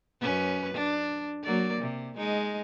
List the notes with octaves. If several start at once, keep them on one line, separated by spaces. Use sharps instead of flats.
F#2 C#4 B4
D4
F#3 A#3 D5
C3
G#3 D#4